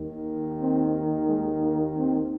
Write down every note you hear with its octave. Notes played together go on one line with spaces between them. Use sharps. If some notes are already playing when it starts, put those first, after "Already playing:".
Already playing: D#2 D#3
C4
G#3
A#3
C4